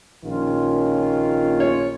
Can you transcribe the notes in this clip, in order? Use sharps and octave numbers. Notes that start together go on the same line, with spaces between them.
A#1 D#3 C#4 F4
C#5